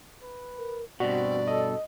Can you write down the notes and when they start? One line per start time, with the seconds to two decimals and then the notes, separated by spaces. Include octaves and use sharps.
0.23 B4
0.58 A#4
1.00 G2 B2 C4 F#4 D5
1.48 A4 D#5